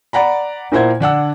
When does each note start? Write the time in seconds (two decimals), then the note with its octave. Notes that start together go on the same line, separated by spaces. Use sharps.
0.13 D5 F#5 A#5 B5
0.72 A#2 A#3 E4 C5 F#5 G#6
1.00 D3 D4 F#5 E6